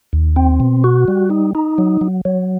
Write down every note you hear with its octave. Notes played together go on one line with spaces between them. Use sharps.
D#2
C4
B2
F#4
G3
D#4
D#4
F#3
F#3
F#3